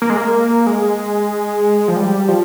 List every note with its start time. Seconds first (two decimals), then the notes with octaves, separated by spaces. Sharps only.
0.02 A#3
0.10 G#3
0.17 A#3
0.67 G#3
1.88 F3
1.97 G3
2.28 F3